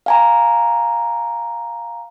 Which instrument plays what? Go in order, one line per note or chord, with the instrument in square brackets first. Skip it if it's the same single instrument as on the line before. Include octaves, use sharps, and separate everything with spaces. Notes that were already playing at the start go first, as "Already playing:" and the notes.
[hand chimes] F5 G#5 A#5